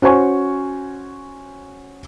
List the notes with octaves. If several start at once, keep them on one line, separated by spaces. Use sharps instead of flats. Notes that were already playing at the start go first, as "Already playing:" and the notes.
C#4 F#4 C5 G#5 C#6